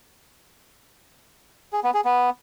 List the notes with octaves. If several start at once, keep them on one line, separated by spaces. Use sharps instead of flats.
G#4
B3
G#4
B3